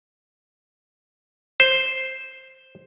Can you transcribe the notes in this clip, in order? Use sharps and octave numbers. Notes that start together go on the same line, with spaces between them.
C5